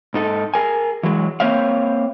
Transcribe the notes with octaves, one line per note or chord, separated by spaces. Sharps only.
G#2 D#4 A4
G#4 A#4 G#5
E3 F#3 G#3
A#3 C4 C5 C#5 E5 F5